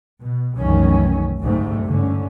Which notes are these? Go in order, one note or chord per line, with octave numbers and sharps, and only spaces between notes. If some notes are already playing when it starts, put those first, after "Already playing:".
B2
C2 F#2 D#3 E3 A3 C#4
G#1 D2 G#2 C3 A3
G1 G#2 D3 C#4